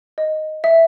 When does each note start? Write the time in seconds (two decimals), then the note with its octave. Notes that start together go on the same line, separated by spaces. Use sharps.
0.18 D#5
0.64 E5